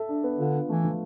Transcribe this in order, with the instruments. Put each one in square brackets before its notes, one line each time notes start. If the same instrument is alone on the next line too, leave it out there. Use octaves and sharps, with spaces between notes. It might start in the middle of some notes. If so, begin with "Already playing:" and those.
Already playing: [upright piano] A4 E5
D4
B3
[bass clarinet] D3 [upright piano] F4
[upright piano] D4
[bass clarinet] E3 [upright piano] A3
[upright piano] F3